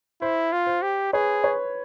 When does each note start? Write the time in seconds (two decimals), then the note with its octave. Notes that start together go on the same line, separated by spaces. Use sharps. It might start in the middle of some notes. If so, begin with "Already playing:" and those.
0.21 E4 C5
0.52 F4
0.67 C5
0.82 G4
1.13 G#4 B4 C#5
1.44 B4 C#5